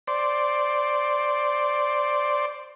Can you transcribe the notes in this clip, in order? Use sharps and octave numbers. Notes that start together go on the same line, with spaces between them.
C5 D5